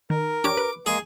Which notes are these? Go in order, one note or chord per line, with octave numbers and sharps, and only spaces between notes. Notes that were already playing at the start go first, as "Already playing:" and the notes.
D#3 A#4
D4 G4 C#5 D6
B4
G#3 A#3 G#4 G#5